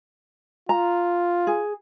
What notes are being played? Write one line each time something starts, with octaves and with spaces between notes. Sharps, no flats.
F4 A#5
G#4